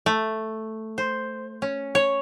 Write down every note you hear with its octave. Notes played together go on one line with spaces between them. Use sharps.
A3
C5
C#4
C#5